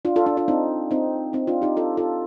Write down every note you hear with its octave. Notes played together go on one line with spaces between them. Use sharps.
D4 F4
F4 A4
D4 F4
D4 F4
C4 D#4
C4 D#4
C4 D#4
D4 F4
D#4 G4
F4 A4
F4 A4